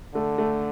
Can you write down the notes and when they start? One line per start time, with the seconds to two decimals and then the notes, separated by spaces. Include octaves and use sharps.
0.15 D3 A3
0.38 A3